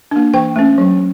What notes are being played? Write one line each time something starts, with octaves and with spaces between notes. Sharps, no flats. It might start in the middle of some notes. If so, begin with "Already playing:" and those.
A#3 D4
E3 G5
A3 C#4
F#3